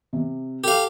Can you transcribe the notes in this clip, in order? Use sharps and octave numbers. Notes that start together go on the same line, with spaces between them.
C3
G4 A4 F5